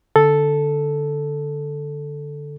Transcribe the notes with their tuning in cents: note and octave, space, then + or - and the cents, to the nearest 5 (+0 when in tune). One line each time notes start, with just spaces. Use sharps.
D3 +0 A4 +0